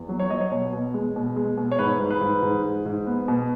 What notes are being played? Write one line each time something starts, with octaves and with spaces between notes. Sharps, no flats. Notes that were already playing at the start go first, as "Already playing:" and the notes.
Already playing: E2
F#3
C#5
F#3 D#5
C#5
B2 C#5
B2
G#3
B2
G#3
B2
C#5
G#2 B4
G#2
B4
G#2
G#2
G#2
G#2
B3
B2